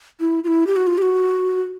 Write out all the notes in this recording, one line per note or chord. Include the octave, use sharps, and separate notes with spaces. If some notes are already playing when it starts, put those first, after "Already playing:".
E4
F4
E4
G4
F#4
F4
G4
F#4